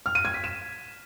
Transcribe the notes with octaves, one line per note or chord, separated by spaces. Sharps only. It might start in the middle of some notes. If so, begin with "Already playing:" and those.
F6
D#7
G#6
B6
E7